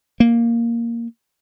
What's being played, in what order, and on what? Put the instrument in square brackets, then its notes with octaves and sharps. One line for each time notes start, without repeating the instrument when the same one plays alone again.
[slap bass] A#3